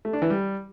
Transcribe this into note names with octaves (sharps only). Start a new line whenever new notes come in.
A3
D4
E3
G3